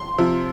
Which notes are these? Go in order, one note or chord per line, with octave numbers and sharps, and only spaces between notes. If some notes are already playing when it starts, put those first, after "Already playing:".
Already playing: C6
C3 F3